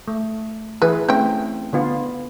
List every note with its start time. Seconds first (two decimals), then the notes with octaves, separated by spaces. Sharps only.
0.08 A3
0.82 E3 E4 G#4 B4
1.09 A3 C4 C#4 G5
1.73 D3 B3 F4